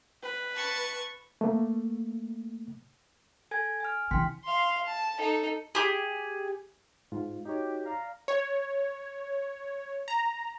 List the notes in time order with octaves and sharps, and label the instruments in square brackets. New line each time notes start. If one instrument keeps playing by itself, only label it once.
[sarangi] B4
[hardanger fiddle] A5 C#6
[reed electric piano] A3 A#3
[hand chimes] A4 G#5 G#6
G#5 F6
[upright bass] C3 E3 [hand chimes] G5 C6 B6
[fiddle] F5 C6
A5
D#4 A4
[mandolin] G4 G#4
[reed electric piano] G#2 F4
[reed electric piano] D#4 C#5 [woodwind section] F#4 G4
[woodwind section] D5 F5 A#5
[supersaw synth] C#5
A#5